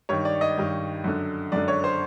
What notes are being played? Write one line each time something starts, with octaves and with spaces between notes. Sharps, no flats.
G2 D#3 C#5
D5
D#5
G2 D#3
F#2 D3
F#2 D3 D5
C#5
C5